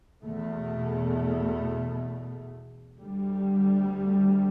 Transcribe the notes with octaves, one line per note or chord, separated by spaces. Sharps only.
E2 B2 A3
D2 D3 G3